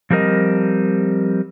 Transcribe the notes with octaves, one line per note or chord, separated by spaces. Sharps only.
F3 G3 C4 A#4 D#5